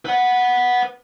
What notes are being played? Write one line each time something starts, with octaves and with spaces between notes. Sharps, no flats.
B4 F#5